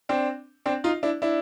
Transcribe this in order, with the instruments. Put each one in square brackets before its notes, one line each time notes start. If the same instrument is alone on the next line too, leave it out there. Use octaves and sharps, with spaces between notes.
[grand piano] C4 D4
C4 D4
D#4 F4
D4 E4
D4 E4